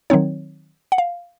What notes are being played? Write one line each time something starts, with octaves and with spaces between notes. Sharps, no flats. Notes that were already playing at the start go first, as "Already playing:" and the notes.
D#3 F#3 C4 D#4 C#5
F#5
F5